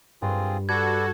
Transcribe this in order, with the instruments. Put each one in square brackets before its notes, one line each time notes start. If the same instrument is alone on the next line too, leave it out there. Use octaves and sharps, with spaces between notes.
[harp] G2 [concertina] C4 F4 G#4
[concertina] D4 B4 D5 [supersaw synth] F#4 A4 [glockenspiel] G#6